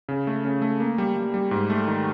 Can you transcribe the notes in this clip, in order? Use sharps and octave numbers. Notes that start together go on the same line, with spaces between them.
C#3
A3
C#3
A3
A#3
G3
G3
G3
G#2
A3
D#3